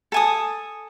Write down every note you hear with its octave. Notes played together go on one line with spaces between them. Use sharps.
A4 G#5 D#6